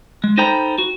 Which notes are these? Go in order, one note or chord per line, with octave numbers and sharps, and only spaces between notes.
G#3
D#4 A4 C5 G5 A#5 B5
F#4